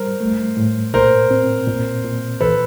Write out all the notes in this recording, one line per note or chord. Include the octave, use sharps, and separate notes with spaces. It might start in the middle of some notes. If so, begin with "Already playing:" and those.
Already playing: G3 A#4 C5
A3
A2
A#2 A#4 C5
C4
A#2
A#2
E3 A4 B4